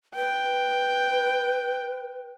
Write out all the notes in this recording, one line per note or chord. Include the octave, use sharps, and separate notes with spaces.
B4 G5